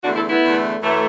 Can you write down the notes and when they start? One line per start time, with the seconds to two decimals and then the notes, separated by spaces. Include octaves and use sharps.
0.03 E2 D3 A3 D4 F#4
0.16 E4 A4
0.29 B3 E4
0.42 E2 D3 A3
0.82 F#2 E3 A3